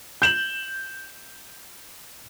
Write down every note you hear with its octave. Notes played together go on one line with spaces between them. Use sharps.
G6 E7 F#7